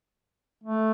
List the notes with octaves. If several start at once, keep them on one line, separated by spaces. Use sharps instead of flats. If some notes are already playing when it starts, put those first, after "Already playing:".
A3